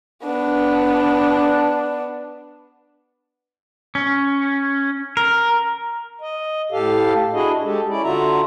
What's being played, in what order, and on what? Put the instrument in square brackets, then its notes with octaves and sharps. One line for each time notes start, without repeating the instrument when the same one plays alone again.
[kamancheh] B3 D4
[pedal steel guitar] C#4
A#4
[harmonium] D#5
A2 G4 A4 F5
D4 E4 F#4 G#4 D#5
G#3 G4 A4
C#4 E4 D5
D3 F4 F#4 E5 A#5